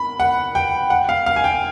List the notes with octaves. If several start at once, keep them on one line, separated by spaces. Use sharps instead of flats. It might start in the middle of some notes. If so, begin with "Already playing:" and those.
Already playing: B5
F#5
G5
F#5
F5
F5
G#5
G5